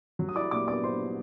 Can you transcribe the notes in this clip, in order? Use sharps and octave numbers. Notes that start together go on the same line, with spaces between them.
F#3
D#6
E4 D5 D6
A#2 D5 D6
B3 D5 D6
E4 C5 C6
E4